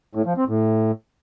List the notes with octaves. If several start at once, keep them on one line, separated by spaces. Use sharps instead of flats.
A2
F3
C4
A2